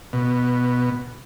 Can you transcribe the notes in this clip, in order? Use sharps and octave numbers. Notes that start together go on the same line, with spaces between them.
B2